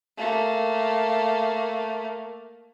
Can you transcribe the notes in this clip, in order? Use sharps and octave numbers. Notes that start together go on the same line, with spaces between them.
A3 A#3